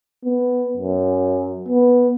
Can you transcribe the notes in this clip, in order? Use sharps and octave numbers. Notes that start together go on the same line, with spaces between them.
B3
F#2
B3